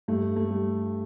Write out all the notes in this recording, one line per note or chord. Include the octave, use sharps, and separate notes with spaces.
G2 A3
A3
G3